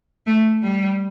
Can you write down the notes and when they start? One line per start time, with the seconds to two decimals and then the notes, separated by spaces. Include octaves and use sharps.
0.27 A3
0.63 G3